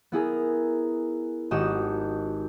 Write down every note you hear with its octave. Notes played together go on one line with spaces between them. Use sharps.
B3 E4 G#4 A#4
G#1 D#4 F#4 G4 D#5 E7